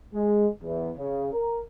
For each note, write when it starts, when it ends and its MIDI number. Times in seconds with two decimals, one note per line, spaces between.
0.14 0.47 56
0.62 0.91 40
0.98 1.29 49
1.34 1.60 70